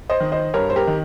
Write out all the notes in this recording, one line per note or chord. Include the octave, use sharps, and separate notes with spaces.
C5 D#5
D#3
C5 D#5
G2 A#4 C#5
C5
G4 A#4
D#3